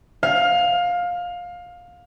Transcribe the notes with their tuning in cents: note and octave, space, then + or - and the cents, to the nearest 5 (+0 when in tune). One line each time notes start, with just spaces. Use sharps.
F5 +20